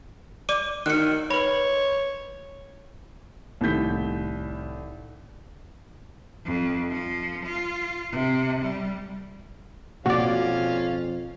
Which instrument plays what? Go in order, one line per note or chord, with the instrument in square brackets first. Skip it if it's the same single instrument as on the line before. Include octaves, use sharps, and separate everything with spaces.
[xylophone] D5 D6 D#7
[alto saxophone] D#3 [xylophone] F#6 C#7
[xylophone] B4 B5 [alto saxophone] C#5
[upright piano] C2 A2 D#3 G6 B6
[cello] F2
F3
F4
C3
G3
[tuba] F2 [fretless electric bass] B2 A#3 [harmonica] C#4 F4 F5 [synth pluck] F#4 D5